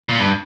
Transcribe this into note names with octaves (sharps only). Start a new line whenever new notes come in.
A#2
G2